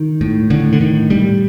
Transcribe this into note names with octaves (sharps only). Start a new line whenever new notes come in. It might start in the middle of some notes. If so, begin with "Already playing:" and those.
Already playing: D#3
A2
A2 D3
D3
A2 D#3
A2 G3